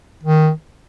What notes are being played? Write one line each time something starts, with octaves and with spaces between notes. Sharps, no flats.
D#3